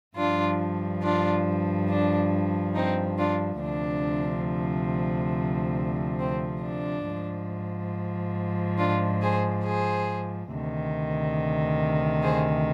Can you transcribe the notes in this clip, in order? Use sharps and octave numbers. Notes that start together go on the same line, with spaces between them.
G2 F3 D4 F4
D4 F4
D4
C4 D#4
D4 F4
D2 C3 F3 D4
C4
D4
G#2 F3
D4 F4
G#4 C5
G#4 C5
D2 C3 D#3
G#4 C5